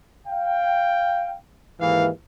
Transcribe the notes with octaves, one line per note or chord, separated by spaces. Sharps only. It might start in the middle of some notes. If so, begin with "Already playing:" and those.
F5 G5
D#2 G#2 E3 F5